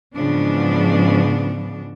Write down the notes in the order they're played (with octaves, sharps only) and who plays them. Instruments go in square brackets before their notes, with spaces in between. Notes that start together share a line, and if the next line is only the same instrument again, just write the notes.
[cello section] G#2 C#3 E3 F3 B3 D4